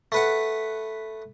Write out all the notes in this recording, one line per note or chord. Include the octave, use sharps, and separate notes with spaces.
A3 B4 F#5